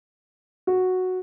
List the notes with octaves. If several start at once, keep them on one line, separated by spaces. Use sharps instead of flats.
F#4